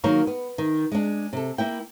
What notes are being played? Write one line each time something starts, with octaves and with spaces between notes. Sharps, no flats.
D#3 F#3 A#3 A#4 C#5
B3
D#3
G#3 D4
C3 A4
A#3 E4 G5